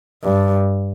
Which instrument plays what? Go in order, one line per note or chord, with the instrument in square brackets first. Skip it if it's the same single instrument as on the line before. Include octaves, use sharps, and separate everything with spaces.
[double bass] G2